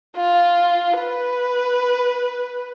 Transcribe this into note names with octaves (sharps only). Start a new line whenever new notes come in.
F4
B4